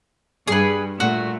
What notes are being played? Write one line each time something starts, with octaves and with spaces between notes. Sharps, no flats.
G2 G#4 B4
A#2 A3 F#4